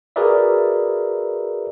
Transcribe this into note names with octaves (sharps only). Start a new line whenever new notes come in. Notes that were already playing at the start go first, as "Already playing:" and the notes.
F#4 G#4 A#4 B4 D5 E5